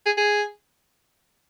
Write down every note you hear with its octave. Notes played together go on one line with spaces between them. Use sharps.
G#4
G#4